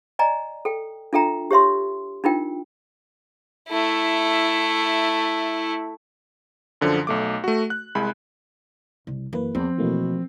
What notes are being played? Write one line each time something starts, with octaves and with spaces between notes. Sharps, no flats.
D5 D#5 G#5 A#5
A4 G5
D4 F4 A4 E5 G5 A#5
G4 C#5 E5 C6
D4 D#4 F4 A#4 G5
A3 E4
F#2 D3 F3
B1 A3 D6
A3 F#4
F#6
C2 G#3 B5
C2
F#2 E3 A#3 B4
E2 F3 C4
B2 E3 A3 A#3